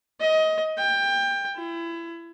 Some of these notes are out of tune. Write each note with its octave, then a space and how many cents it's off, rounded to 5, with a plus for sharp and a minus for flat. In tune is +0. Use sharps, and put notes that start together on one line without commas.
D#5 +20
G5 +20
E4 +30